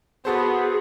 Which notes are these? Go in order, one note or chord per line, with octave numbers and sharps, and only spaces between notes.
B3 F#4 G#4 A4 C5